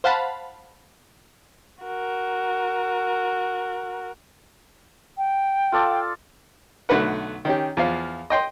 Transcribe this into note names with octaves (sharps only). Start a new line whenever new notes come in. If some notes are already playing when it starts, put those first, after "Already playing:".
C5 F5 F#5 A5 B5
F#4 A#4
G5
F4 A4 D5
B1 D3 A3 F#4 B4 F#5
D#3 C#4 G4
E2 F3 F5
D#5 G5 C6